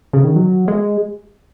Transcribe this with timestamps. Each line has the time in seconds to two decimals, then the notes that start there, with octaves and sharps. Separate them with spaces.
0.13 C#3
0.24 D#3
0.36 F#3
0.68 G#3